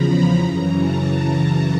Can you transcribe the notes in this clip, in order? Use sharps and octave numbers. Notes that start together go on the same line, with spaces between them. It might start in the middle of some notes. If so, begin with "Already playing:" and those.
Already playing: E2 C#3 F3 A#5 B5
F#2 C#3 E3 A#5
A5
A#5